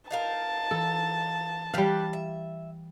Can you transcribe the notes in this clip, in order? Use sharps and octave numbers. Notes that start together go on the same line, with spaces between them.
D#4 F4 A#4 A5 A6
E3 A4
E3 G3 G4 B4 F5 F#5 G6 G#6
E5